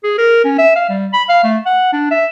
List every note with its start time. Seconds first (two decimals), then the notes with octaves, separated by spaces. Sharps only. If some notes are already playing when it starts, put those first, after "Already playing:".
0.04 G#4
0.18 A#4
0.44 C#4
0.58 E5
0.76 F5
0.89 G3
1.13 B5
1.29 F5
1.44 A3
1.66 F#5
1.93 D4
2.11 E5